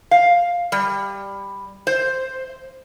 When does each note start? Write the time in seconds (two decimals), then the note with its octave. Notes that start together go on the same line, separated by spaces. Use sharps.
0.11 F5
0.72 G3
1.87 C5